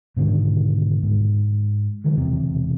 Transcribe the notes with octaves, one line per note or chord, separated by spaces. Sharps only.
G#2 B2 D3 D#3
G#2
D#3 E3 F#3 G#3
E1 B1 E2 C3